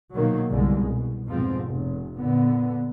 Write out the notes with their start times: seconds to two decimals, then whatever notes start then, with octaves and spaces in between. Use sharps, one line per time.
0.14 B2 D#3 F#3 A#3
0.48 G1 C2 D3 G#3
0.86 B2
1.26 F2 G#2 B2 F3 C4
1.66 F1
2.15 A#2 D3 B3